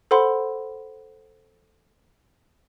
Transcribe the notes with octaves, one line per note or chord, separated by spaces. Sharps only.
A4 C5 F#5 B5 C6